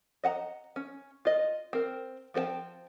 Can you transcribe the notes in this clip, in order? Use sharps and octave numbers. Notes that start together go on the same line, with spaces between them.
D#5 F#5 A5 A#5
C#4
F4 D#5
C4 A#4
F3 C4 A4 G5 A5